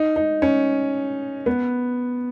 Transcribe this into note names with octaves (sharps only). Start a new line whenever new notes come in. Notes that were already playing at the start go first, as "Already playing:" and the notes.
Already playing: D#4
D#4
C#4
B3